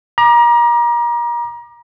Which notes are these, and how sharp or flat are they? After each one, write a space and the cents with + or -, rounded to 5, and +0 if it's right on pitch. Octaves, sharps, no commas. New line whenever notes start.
A#5 +30 D6 +30